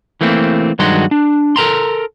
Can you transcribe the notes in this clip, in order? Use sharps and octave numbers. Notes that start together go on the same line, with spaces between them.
E3 A3 A#3 C4
G2 D#3 F#3 G#3 F#4 C6
D4
A4 A#4 A#5 C6